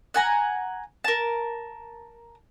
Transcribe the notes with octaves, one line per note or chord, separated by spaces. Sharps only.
F#5 G#5 A#5
A#4 A5